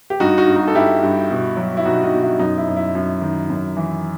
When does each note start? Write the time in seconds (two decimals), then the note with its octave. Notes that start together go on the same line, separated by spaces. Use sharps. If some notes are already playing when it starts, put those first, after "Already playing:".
0.10 G4
0.20 G2 D#4 F#4
0.38 D#4 F#4
0.48 G2
0.56 D#4 F#4
0.68 A4
0.74 G2 E4 G4
1.03 G2
1.30 B2
1.57 F#3
1.77 E4
1.85 B2 D#4 F#4
2.03 D#4 F#4
2.13 B2
2.22 E4
2.39 F#2 D#4
2.58 E4
2.68 F#2
2.76 E4
2.95 F#2
3.21 D#3
3.50 F#2
3.77 E3